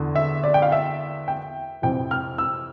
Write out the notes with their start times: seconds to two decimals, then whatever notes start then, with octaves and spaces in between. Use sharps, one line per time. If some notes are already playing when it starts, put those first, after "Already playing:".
Already playing: E2 D3
0.16 E5
0.44 D5
0.54 G5
0.62 F5
0.72 E5
1.28 G5
1.82 F2 C3 E3 G5
2.11 F6
2.38 E6